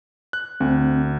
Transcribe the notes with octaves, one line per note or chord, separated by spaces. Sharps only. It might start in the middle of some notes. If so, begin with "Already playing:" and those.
F#6
D2 C4